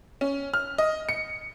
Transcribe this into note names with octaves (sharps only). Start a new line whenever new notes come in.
C#4
F6
D#5
C#7